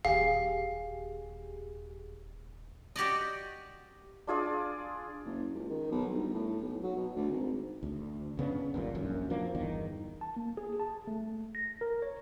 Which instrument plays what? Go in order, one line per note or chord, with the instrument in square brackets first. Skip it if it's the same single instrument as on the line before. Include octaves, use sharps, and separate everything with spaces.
[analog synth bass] D#1 [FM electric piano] D#2 G4 G#4 [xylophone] F5
[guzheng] F#4 G4 D5 D#5
[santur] D4 F4 G#4 D5
[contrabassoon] F#1
C#2
D#3
B1
G1
A2
B1
F#3
B2
D2
G#1
[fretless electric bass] D2
F#1 C#3 B3 D4
G1 D#2 A#2
D#1 A#1 F#2
F1 F3 A#3 D4
G1 E2 D#3
[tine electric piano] A5
A#3
G#4
A5
A3
A#6
A#4
C#5